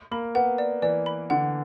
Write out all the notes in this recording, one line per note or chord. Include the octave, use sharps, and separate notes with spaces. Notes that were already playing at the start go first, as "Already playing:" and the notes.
A#3 B5
B3 F#5
D5
E3 D5
B5
D3 F#5